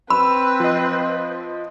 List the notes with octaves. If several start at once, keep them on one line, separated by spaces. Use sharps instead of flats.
C4 B4 B5 E6
F3 D#5